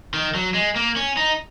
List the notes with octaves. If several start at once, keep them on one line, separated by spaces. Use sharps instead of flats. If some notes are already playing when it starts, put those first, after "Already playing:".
D#3
F#3
G#3
A#3
C#4
D#4